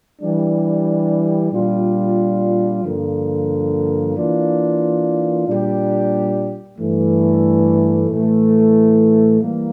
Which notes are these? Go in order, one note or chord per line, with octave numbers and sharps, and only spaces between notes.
E3 G3 D4 G4
A#2 G3 D4 F4
G2 D3 F3 A#3
E3 A#3 D4 F4
A#2 G3 D4 G4
G2 E3 A3
A2 E3 A3
E3 G3 A#3